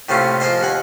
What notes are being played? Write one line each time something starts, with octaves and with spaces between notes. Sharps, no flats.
A2 C3 A3 A#3 C#4 F4
F3 G#4 A#4 C5 D#5
D#2 F#5 G#5